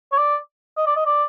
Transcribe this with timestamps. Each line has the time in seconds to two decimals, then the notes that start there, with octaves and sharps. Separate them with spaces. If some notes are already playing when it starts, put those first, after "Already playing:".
0.12 C#5
0.18 D5
0.77 D#5
0.86 D5
0.96 D#5
1.06 D5